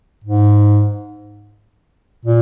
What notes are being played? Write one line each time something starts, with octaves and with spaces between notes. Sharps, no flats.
G#2
A#2